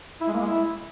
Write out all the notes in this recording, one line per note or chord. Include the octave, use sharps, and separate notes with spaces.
E4
G#3
A#3
G#3
E4